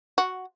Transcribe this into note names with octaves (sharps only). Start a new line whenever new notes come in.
F#4